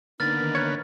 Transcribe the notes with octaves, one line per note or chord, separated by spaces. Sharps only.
D3 A#3 B3 D#4 F6 A6
D#3
A#4 B4 C#5